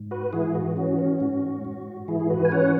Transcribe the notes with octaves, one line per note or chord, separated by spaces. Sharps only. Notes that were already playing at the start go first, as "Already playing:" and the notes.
Already playing: G#2
F#4 B4
E3 E4 G#4
F#4
C#4 F#4
F#4
G#2
G#2
E3 E4 G#4
G#4
F#4 B4
G#5
C#4 C#5 F#5